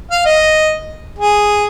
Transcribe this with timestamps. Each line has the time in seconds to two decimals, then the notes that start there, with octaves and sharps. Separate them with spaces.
0.11 F5
0.26 D#5
1.19 G#4